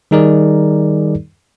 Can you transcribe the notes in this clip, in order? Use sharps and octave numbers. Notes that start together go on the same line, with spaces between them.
D#3 G3 D#4 G#4 A#4 D5